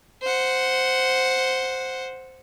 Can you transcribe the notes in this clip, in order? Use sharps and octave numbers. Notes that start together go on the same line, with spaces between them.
C5 F#5